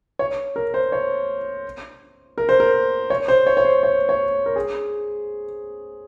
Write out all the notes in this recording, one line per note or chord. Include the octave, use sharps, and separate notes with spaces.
C#5
A#4
C5
C#5
A#4
C5
A#4
C#5
C5
C#5
C#5
C5
C#5
C#5
A#4
G#4